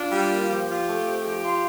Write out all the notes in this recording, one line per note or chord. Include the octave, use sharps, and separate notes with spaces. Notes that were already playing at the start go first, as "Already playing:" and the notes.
Already playing: D4 F4
G3
A#3
F4
F3 G4
F4
A3
C4
F3 G4
F4